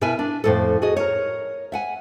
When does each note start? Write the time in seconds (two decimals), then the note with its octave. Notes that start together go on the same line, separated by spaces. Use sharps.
0.01 B2 E4 A#4 B4 E5 G#5
0.19 D4
0.44 F2 A2 A4
0.82 F#4 G#4 D#5
0.97 A#4 C#5
1.72 E5 F#5 G#5